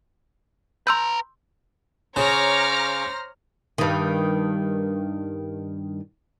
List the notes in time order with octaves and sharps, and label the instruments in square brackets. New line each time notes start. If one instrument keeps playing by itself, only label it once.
[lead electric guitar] B4 A#5 [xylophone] C6 E6 G6
[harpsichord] C#3 [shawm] C5 [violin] C#5 D6 [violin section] A#5 F6 A#6
[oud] G2 D#3